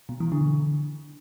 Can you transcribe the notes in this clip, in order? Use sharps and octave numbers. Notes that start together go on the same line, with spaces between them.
B2
E3
D3